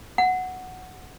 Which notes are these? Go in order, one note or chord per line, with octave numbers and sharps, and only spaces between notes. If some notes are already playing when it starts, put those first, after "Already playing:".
F#5